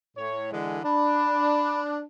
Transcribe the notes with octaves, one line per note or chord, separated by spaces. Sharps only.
A2 C#5
D3 E3 G#3
D4 B5